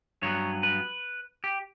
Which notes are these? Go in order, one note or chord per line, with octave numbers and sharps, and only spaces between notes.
G2 F#3 B3 C#5
B4
G4